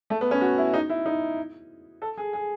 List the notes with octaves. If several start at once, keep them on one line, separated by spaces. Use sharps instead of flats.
A3
B3
C#4
F#4
E4
D#4
E4
D#4
A4
G#4
G#4